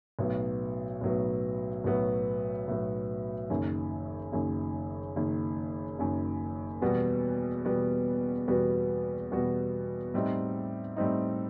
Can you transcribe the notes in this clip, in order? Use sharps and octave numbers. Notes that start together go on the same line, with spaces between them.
B1 A2 F#3 B3
B1 A2 F#3 B3
B1 A2 F#3 B3
B1 A2 F#3 B3
F#1 F#2 D#3
F#1 F#2 D#3
F#1 F#2 D#3
F#1 F#2 D#3
E2 B2 G3 B3 F#4
E2 B2 G3 B3 F#4
E2 B2 G3 B3 F#4
E2 B2 G3 B3 F#4
A2 G3 C4 D#4
A2 G3 C4 D#4